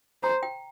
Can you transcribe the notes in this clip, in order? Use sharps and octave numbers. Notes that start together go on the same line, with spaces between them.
C5 A#5
G5